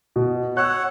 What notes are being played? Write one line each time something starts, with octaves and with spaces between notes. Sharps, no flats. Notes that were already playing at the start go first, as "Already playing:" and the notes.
B2
C#5 F#5 E6 F#6